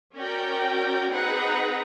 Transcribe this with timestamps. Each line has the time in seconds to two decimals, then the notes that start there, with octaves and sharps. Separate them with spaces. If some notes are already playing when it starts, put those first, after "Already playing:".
0.17 C#4 F#4 A#4 D5 G5
1.09 C4 D#4 G#4 B4 F#5 A#5